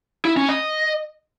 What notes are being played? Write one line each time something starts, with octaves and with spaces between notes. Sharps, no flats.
E4
C#4
D#5